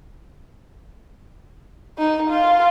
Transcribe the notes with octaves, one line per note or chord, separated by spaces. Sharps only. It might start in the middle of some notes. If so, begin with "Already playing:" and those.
D#4
F4